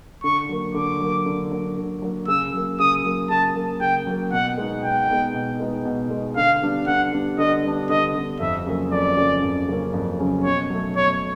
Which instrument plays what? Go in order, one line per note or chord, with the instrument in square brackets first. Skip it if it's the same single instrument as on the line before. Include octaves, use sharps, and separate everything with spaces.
[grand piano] D3 [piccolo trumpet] C#6
[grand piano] F#3 A#3
[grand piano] D3 [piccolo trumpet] D6
[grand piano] F#3 A#3
D3
F#3 A#3
D3
F#3 A#3
[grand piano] C#3 [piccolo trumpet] E6
[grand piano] F#3 A#3
[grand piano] C#3 [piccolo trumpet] D#6
[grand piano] F#3 A#3
[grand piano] C#3 [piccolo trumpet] A5
[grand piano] F#3 A#3
[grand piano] C#3 [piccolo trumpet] G5
[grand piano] F#3 A#3
[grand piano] B2 [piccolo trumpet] F#5
[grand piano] G#3 B3 D#4
[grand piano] B2 [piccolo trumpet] G5
[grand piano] G#3 B3 D#4
B2
G#3 B3 D#4
B2
G#3 B3 D#4
[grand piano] D3 [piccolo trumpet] F5
[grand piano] G3 B3 D4
[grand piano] D3 [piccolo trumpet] F#5
[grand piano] G3 B3 D4
[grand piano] D3 [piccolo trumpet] D#5
[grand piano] G3 B3 D4
[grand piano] D3 [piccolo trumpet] D#5
[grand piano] G3 B3 D4
[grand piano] F2 [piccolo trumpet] E5
[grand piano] C#3 F#3 A#3 C#4
[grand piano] F2 [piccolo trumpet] D5
[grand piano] C#3 F#3 A#3 C#4
F2
C#3 F#3 A#3 C#4
F2
C#3 F#3 A#3 C#4
[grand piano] B2 [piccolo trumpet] C#5
[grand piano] F#3 A3
[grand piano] B2 [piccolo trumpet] C#5